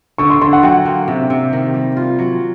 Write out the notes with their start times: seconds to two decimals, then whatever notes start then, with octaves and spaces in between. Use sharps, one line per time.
0.18 D3 C#6
0.30 C6
0.41 D3 C6
0.53 F#5
0.63 F#3 G5
0.85 A#3
1.08 C3
1.30 C3
1.53 D#3
1.74 G3
1.97 F4
2.19 F#3